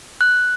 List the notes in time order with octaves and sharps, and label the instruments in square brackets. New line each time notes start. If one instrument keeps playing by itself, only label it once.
[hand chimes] F#6